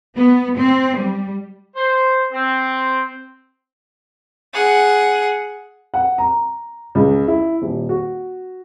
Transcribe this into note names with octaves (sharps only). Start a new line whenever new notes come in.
B3
C4
G3
C5
C4
G#4 F#5
F#5
A#5
C#2
E4
D#1
F#4